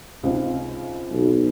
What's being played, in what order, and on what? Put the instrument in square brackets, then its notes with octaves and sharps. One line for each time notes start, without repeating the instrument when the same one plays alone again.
[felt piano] C#2 C3 D#4
[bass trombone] B1